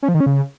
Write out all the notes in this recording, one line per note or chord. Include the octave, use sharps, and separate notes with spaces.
C#4
F3
D#3
C#4
C#3